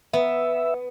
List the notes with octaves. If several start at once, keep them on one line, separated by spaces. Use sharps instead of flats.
B3 E5